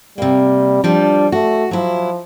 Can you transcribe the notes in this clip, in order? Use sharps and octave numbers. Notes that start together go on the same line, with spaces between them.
C3 G3 A#3
F3 G3 D4
A3 F#4
F3 F#3 E4